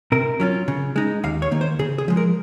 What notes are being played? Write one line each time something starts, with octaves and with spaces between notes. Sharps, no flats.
C3 A#4
F#3 C#4 F4
C#3
G#3 D#4
D#2 F5
C#5
D#3 A#3
C5
C#3 G#4
G#4
F3 G#3
A#4